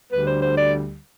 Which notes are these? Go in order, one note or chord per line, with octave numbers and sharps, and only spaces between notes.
D2 D3 G3 B4
C5
C5
D5